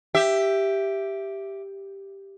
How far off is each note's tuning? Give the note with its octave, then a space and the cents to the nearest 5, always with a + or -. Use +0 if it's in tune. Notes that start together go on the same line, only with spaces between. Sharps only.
G4 +0 E5 +10